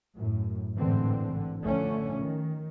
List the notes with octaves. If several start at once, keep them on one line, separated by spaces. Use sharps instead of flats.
F#2 A2
A1 G#2 D3 E3 C4
D3
D3 F3 A3 C#4
D#3